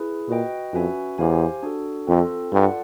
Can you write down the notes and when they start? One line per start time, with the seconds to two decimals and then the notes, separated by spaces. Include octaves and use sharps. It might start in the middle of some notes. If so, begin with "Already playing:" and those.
Already playing: E4 G#4 B4
0.28 A#2 F#4 B4 D#5 G5
0.73 F2 C#4 F#4 B4 E5 G#5
1.19 E2 G4 C5 F5 G#5
1.63 D4 F#4 A4
2.07 F2 C4 F4 A4
2.52 G2 F4 A4 D5 F#5 A5